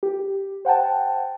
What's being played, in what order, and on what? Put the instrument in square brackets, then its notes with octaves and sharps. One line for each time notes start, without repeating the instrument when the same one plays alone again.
[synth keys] G4
C5 F#5 G5 A5